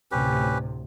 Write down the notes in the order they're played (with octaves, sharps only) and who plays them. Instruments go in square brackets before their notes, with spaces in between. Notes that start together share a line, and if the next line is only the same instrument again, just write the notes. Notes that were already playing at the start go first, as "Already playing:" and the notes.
[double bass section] D2 A2 C3 [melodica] C#4 G4 B4